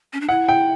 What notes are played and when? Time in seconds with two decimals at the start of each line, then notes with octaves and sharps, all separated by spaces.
0.13 C#4
0.21 D4
0.29 E4 F#5
0.48 G5